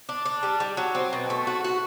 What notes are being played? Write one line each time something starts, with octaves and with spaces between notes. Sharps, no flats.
D4
D4
G3
G3
F#3
C4
B2
A3
F#4
F#4